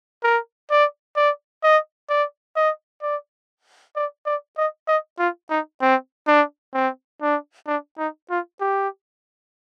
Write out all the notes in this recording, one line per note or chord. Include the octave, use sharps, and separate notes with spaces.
A#4
D5
D5
D#5
D5
D#5
D5
D5
D5
D#5
D#5
F4
D#4
C4
D4
C4
D4
D4
D#4
F4
G4